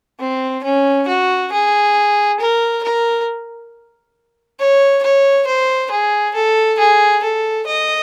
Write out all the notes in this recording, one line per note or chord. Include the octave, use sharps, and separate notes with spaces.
C4
C#4
F#4
G#4
A#4
A#4
C#5
C#5
C5
G#4
A4
G#4
A4
D#5